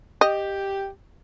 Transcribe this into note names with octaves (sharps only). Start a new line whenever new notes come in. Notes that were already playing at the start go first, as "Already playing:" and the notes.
G4 D#5